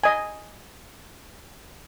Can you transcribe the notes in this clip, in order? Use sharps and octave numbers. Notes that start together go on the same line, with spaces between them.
D#5 G#5